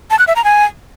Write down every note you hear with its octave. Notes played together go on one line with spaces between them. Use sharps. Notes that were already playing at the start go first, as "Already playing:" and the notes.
A5
F#6
E5
A#5
G#5